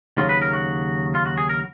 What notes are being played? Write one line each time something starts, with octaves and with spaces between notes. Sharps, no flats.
D#2 C#3 F#3 F4
B4
A#4
F#4
F4
F#4
G#4
A#4